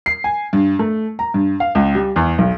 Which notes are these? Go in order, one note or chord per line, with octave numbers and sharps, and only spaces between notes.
C7
G#5
G2
A3
A#5
G2
F5
C#2
G3
E2
B1